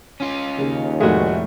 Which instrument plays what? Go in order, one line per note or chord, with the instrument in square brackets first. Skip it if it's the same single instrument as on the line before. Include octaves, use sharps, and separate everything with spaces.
[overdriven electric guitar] C#4 F4
[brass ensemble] D#2 [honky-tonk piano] C#3
[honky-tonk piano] F1 A2 A3 [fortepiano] G#3 F#4